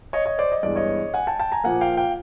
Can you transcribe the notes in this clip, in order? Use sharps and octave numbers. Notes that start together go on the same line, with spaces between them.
C#5 D#5
C#5 D#5
C5 D5
D#5
G2 E3 G#3 B3 D5
C#5 D#5
F#5 G#5
G5 A5
G5 A5
G#5 A#5
A#2 F3 A#3 F#5 G#5
F5 G5
F5 G5